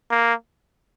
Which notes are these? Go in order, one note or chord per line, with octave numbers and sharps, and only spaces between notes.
A#3